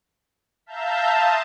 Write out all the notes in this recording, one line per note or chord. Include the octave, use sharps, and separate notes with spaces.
E5 F5 A5 A#5 G6
A5 C6 D#6